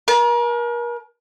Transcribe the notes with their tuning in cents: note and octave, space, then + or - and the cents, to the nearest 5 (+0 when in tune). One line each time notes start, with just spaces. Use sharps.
A#4 +35 A5 -35